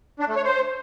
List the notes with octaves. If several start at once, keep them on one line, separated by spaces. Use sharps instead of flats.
D4
A3
C#5
C5